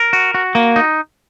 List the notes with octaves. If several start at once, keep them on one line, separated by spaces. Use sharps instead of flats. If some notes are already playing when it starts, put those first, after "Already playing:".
Already playing: A#4
F#4
F#4
A#3
D#4